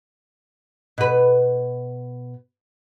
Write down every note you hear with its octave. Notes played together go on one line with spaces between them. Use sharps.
B2 B4